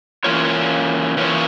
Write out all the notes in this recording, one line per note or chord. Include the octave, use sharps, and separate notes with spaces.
E3 A#3 C#4 F4 C#5
E3 A#3 C#4 F4 C#5